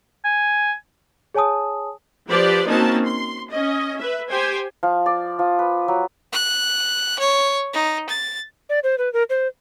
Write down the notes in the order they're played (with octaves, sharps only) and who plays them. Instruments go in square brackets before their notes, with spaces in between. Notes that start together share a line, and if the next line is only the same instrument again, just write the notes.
[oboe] G#5
[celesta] G#4 C#5 G#5 A5 D#6
[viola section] F3 G4 B4 C5 D5
A#3 C4 C#4 D#4 F#4 A5
C6
C#4 D#5
B4 E5
G4 C5 G5 G#5
[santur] F3
D5
F3
B4
F#3
[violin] F#6
C#5
D#4
A6
[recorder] D5
C5
B4
A#4
C5